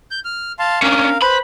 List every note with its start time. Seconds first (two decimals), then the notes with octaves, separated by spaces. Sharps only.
0.11 G6
0.25 F6
0.59 F5 A5 C6
0.82 C#4 D4 A#4 F5
1.22 B4 C5 B5